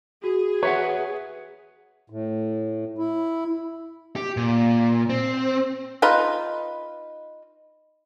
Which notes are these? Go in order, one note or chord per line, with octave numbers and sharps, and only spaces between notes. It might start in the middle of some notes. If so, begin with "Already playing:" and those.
F#4 G#4
B4 C#5 E5 F#5
A2
E4
G4
A#2
C4
D#4 F4 B4